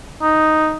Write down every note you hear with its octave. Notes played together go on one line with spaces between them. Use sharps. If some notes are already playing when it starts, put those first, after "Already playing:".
D#4